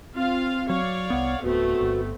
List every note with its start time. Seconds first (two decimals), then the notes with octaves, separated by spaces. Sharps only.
0.15 C4 F4 F5
0.69 F#3 C#5 D5 F5
1.10 C2 B3 F#5
1.44 D1 A3 B3 C4 F#4
1.81 G1